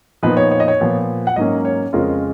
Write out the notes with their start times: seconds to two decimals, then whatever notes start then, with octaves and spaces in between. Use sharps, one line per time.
0.23 A#2 F3 B3 D#4 B4
0.37 C#5
0.52 C#5
0.60 D#5
0.68 C#5
0.80 A#2 F3 B3
1.27 F#5
1.36 G#2 F#3 A#3 C#4 D#5
1.65 C#5
1.93 F2 C#3 G#3 C#4 F4 A#4